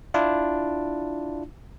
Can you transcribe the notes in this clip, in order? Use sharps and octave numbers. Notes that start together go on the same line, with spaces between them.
D4 E4 F4